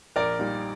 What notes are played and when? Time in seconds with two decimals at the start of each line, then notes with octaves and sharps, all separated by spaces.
0.16 A#1 A#4 D5
0.39 A#2 G3 A#3 D#4